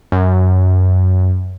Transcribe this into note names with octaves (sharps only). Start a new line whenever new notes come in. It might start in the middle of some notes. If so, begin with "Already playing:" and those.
F#2